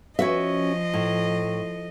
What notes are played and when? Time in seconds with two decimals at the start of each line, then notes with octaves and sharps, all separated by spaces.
0.19 F3 C#4 F#4 D#5 E5
0.94 A2